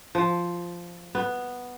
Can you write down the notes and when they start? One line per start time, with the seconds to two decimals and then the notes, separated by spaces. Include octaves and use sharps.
0.15 F3
1.15 B3